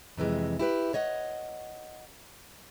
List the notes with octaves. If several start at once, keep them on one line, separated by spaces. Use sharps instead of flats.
F2 C3 E3 G#3
E4 G4 B4
C#5 D#5 F#5